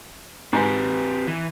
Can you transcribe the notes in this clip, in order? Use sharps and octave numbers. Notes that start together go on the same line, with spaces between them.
G#2 C4 G4 B4
E3